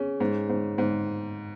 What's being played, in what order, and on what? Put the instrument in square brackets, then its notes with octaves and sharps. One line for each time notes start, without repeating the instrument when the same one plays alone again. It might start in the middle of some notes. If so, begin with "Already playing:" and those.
Already playing: [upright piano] C#4 [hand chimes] G#4 C#5
[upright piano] G#2
G#2
G#2